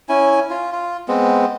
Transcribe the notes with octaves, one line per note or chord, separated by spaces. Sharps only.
C#4 E4 G#5
F4
F4
G#3 B3 C4